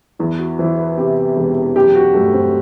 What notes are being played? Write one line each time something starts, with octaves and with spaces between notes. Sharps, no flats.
E2 E4
F#4
E3 C5
B4
C3 G4
E1
F#2 G4
F#4
G1 A3
C4